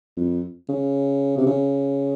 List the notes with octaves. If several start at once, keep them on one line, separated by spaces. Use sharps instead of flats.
F2
C#3
C3
C#3